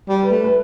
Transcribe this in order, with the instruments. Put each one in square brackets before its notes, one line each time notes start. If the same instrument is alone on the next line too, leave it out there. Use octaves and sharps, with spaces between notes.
[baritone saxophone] G3
[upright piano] B4
[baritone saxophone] A3
[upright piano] B4